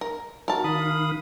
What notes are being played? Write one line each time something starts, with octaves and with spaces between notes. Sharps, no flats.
A#4
F#4 A#4 A5
D#3 F5 B5 D#6